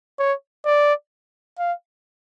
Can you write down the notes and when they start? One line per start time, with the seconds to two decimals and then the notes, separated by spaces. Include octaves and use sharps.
0.19 C#5
0.65 D5
1.58 F5